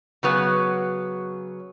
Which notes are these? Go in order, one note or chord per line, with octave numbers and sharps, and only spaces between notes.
C#3 F#3 B3